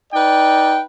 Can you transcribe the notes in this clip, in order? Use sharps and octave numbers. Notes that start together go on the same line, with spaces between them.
D#4 B4 D5 G5